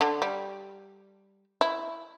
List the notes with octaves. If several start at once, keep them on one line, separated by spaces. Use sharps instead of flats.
D3
G3
E4